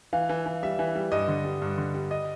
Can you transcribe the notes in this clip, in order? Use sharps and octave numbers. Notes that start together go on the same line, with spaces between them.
E3 F5
E3
E3
G3 E5
E3
G3
G2 D#5
D3
G3
G2
D3
G3
D#5